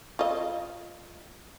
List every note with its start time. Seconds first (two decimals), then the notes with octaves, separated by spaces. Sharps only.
0.19 F4 D#5